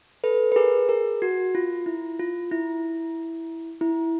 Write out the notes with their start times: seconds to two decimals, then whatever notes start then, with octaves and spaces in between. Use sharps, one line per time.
0.24 A4 B4
0.52 B4
0.56 G#4 A#4
0.89 G#4 A#4
1.22 F#4
1.55 F4
1.86 E4
2.19 F4
2.51 E4
3.81 E4